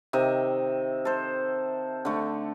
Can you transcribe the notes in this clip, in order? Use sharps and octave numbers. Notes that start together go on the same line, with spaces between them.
C3 D#3 D#5 E5
A4 C5
D3 A3